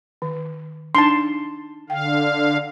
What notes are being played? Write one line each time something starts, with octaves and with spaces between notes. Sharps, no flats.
D#3
D4 D#4 A5 C6
D3 F5 G5